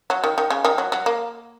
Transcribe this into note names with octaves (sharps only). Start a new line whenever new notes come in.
F#3
D#3
D#3
C#3
D#3
F#3
F#3
A#3